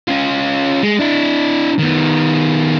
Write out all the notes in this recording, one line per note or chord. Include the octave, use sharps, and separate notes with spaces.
C#4 F4
G#3
D4 E4
D#3 B3